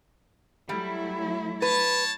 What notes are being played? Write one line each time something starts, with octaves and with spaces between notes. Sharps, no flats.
F#3 G3 A3 E4
B4 C#5 A5